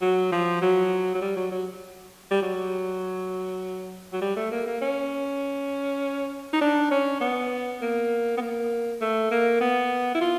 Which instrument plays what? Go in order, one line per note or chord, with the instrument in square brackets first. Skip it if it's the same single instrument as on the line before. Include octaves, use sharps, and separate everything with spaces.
[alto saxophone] F#3
F3
F#3
F#3
G3
F#3
F#3
G3
F#3
F#3
G3
A3
A#3
A#3
C#4
D#4
D4
C#4
B3
A#3
B3
A#3
A3
A#3
B3
E4
F4